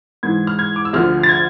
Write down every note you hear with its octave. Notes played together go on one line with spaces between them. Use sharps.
G#2 E3 G#6
F6
G#6
D6
E6
D2 D3 F3 F6
A6
G#6